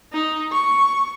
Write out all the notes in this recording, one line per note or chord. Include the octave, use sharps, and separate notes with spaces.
D#4
C#6